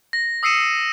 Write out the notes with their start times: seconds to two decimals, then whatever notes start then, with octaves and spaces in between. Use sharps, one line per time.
0.13 A#6
0.43 D#6 E6 C7 C#7 D#7 E7